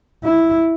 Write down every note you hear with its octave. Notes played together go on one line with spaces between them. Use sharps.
E4